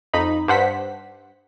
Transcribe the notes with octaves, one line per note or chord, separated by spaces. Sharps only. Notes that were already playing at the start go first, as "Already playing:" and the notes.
F2 D#4 B5
G2 C5 F#5 B6